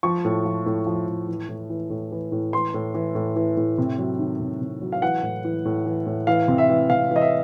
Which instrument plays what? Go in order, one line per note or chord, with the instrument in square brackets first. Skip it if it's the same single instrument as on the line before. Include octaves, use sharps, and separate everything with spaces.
[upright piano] F3 C#6
A2
F3
A2
F3
A2
E3
A2
E3
A2
E3
A2
E3 C6
A2
E3
A2
E3
A2
C3
F#3
D#3
C3
C3
F#3
F5
E3 F#5
A2
E3
A2
E3
A2
E3 F5
C3
E5
E3
C3 F5
E3
D#5
E5